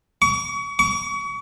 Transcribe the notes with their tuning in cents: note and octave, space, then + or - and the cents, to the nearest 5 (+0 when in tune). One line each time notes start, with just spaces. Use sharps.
C#6 +35
C#6 +35